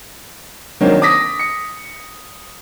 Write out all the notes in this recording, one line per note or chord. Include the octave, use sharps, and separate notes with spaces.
D#3 F#3 A#3 C4 D4
D6 D#6 A#6 B6
C#7